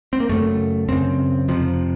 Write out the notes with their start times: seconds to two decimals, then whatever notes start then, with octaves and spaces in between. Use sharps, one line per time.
0.13 C4
0.20 A#3
0.29 F#2 C#3 A3
0.88 F#2 C#3 C4
1.48 F2 C3 F3